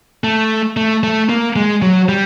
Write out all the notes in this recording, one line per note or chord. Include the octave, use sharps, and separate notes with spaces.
A3
A3
A3
A#3
G#3
F#3
G3